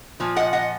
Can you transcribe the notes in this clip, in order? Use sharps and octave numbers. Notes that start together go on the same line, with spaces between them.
A#2 F3
D#5 F#5
D#5 F#5